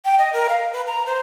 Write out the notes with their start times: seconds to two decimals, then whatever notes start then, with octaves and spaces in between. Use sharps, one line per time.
0.05 G5
0.18 D#5
0.33 A#4
0.49 F5
0.73 B4
0.87 A#5
1.06 C5